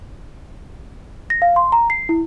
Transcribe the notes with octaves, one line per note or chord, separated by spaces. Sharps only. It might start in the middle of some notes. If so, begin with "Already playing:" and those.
A#6
F5
C6
A#5
C7
E4